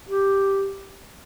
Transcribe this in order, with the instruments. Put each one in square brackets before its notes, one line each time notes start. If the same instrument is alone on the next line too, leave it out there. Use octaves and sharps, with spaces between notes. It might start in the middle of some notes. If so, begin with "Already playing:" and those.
[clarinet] G4